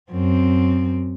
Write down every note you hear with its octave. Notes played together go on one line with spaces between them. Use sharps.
F#2 C4